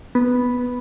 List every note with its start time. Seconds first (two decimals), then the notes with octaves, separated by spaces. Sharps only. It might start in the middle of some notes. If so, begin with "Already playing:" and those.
0.15 B3